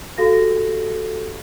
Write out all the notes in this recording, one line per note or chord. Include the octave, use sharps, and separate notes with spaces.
F#4 G4 A4 F5 A#6